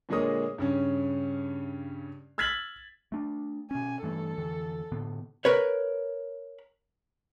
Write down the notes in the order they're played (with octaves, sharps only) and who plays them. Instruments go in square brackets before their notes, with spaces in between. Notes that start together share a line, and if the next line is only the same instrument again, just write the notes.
[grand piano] A#2 D3 G#3 A#3 C#5 D#6
G2 C#3 C#4
E6 F6 G#6 A6 B6 F#7
[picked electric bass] A3 D4
[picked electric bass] B2 C#4 [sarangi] G#5
[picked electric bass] G2 E3 A3 [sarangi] A4
[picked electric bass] F2 D3 E3
A2 D3 B3
[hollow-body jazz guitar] A#4 B4 C#5